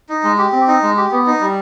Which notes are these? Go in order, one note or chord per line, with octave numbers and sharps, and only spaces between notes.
D#4
G#3
G4
C4
D#4
G#3
G4
B3
D#4
G3